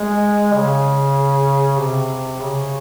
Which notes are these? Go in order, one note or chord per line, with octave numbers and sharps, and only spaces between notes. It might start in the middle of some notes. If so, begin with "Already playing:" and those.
Already playing: G#3
C#3
C3
C#3